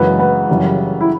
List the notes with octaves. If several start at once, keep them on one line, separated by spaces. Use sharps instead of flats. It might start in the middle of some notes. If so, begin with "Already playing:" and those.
Already playing: F#2 C#3 E3 G#3 B3
B3
F#1 F#2 C#3 E3 G3
E4